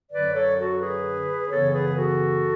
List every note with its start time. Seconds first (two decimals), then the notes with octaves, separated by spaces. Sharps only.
0.11 F#2 D3 F#3 B4 D5
0.34 A4 C#5
0.57 F#4 A4
0.80 G#4 B4
1.49 F#2 C#3 E3 B3 A4 C#5
1.72 G#4 B4
1.95 F#4 A4